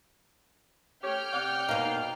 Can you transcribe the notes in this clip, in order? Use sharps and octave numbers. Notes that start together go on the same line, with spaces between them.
A3 G4 C#5 G5 F6 G6
C3 D5 F#5
B2 F#3 A#3 D#4 F5